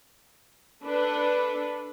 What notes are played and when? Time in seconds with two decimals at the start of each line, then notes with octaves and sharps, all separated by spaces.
0.85 D4 A4 B4